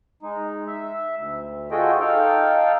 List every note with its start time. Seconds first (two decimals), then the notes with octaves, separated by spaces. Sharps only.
0.22 G#3 D#4
0.67 E5
1.16 D2
1.71 F4 F#4 G#4 A4 D#5 G5
2.00 D#4 A4 F5 G5